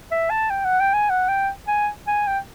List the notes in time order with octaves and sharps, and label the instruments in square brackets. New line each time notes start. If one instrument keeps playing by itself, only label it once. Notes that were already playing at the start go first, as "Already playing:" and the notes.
[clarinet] E5
A5
G5
F#5
G5
G#5
F#5
G5
G#5
G#5
G5